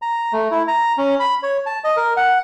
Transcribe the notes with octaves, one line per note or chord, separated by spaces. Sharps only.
A#5
A3
E4
A#5
C#4
B5
C#5
A5
D#5
A#4
F#5